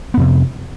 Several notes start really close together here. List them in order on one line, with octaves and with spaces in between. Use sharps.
B3 F2 C3